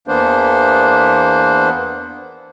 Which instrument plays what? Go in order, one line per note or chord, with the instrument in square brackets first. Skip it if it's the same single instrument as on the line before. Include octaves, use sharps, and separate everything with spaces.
[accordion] E2 E3 A#3 B3 D4 C5